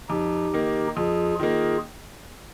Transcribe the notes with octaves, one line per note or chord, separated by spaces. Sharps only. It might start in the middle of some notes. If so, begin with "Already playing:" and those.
F2 D#4 G4
D#3 A#3
F2 F4 G#4
D#3 A#3 F4 G#4